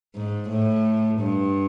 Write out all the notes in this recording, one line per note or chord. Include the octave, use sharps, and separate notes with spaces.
G#2
A2
G2